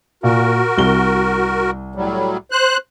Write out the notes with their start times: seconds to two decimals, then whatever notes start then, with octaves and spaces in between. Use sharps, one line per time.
0.23 A#2 F#4 A#4
0.78 C2 G7
1.95 A2 F#3 G3
2.51 C5 F#6